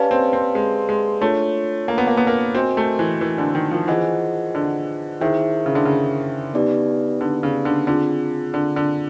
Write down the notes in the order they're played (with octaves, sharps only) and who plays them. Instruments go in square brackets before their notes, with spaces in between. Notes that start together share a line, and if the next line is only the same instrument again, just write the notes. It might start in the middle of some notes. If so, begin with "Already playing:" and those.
Already playing: [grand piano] C#4 [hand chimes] G4 B4 D5 F5 A5
[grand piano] C4
C4
G#3
G#3
[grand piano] A3 [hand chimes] D4 F4 A4 C#5
[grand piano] A#3
B3
A#3
B3
A#3
[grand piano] C4 [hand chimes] F#4 A#4 D#5 G#5
[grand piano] A3
E3
E3
D3
D#3
F3
[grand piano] E3 [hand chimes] F4 G#4 C5 D#5 F#5
[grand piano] D3
[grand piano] D#3 [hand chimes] E4 G#4 C5 E5
[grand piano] C#3
D3
C#3
[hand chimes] B3 D#4 G4 B4 D5
[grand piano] D3
C#3
D3
[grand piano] D3 [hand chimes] C4 F4 G#4
[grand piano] D3
D3